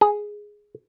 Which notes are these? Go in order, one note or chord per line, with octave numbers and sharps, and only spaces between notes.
G#4